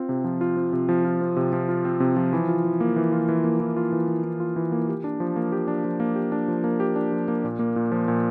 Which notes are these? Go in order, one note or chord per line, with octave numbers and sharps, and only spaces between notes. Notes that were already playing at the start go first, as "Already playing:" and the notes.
Already playing: C4 F4
C3
F3
F4
C4
C3
F3
F4
C4
C3
F3
F4
C4
C3
F3
E3
F4
E3
A#3
E3
F4
E3
A#3
E3
F4
E3
A#3
E3
F4
E3
A#3
G4
D4
F3
A#3
G4
D4
F3
A#3
G4
D4
F3
A#3
G4
D4
F3
A#3
A#2
A#3
A#2
F3
A#2